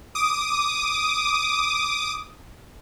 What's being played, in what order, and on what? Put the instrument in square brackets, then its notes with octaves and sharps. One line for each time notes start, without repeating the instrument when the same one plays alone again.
[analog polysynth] D6 D#6